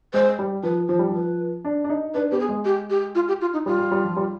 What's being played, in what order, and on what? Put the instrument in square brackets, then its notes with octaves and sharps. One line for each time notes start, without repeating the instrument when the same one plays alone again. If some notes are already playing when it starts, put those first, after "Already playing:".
[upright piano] G#3 [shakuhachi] C5
[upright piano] G3
[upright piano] F3 [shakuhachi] B4
[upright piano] F3 [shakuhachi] C5
[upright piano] G3
[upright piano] F3 [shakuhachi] B4
[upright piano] D4
D4
D#4
[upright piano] D4 [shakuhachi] B4
[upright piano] B3 [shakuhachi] G4
[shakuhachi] G#4
[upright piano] G#3
[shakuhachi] G4
G4
F4
G4
F4
D#4
[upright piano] G3 [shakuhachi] F4
[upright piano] G3
G3
F3
G3